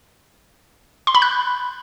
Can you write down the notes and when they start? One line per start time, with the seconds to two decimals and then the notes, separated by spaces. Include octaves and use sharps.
1.07 C6
1.15 B5
1.22 F#6